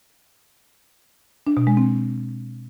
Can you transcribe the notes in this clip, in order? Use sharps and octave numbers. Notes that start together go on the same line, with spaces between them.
D4
B2
G#3
C4